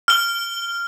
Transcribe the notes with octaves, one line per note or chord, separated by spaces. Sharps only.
F6 G7